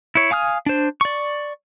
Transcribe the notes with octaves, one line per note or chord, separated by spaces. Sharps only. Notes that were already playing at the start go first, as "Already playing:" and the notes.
E4 C#5
F5 G#5 D#6 F6
D4 C5
D5 C#6